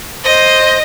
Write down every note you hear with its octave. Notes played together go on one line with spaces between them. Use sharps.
C5 D#5